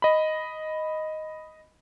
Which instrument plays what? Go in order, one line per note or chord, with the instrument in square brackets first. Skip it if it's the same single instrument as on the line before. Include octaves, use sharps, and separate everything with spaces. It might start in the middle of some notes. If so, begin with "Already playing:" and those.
[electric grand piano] D#5 B5